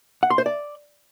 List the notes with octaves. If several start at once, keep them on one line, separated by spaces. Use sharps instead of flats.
F#5
C6
C5
D5